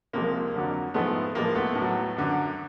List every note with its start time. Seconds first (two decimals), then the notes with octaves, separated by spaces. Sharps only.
0.13 C2 C3 F3 G#3 A#3
0.54 F2 D3 F#3
0.94 G#2 F3 G#3 A3 B3
1.35 A2 F3 G#3 A#3
1.55 A3 B3
1.75 A2 F#3
2.16 F#2 D3 F#3